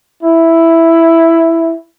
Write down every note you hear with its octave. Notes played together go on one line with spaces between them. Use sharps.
E4